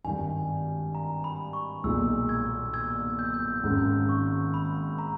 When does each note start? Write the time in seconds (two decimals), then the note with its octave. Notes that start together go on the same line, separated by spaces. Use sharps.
0.04 G#1 G2 D#3 G#5
0.95 A#5
1.24 B5
1.53 C#6
1.84 B1 A#2 G#3 D#4 E6
2.29 E6 G#6
2.73 E6 G#6
3.19 G6
3.26 E6
3.34 G6
3.63 G#1 G#2 D#3 G#3 C#4
4.09 C#6
4.54 B5
4.98 A#5